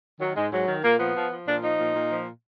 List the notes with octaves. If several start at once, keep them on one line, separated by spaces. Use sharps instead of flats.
D#3 F#3
G#2 G#3
G#2 F#3
D#3
A#2 A#3
F3 B3
F3
F3
A#2 D4
F3 D#4
A#2
A#2
F3